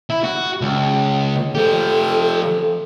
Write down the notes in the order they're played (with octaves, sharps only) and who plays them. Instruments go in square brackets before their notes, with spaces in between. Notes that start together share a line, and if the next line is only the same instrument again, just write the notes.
[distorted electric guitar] E4
F#4
C#2
[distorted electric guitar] F3 G4 [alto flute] A4